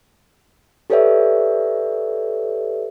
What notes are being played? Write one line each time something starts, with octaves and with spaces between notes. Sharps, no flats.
G4 A4 B4 C#5 D5 E5